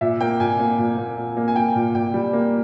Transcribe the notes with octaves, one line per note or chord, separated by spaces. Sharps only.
A#2 E5
A#3 G5
A#2 G#5
A#3
A#2
A#3
A#2
A#3
G#5
A#3 G5
A#2
A#2 G5
G3
A#3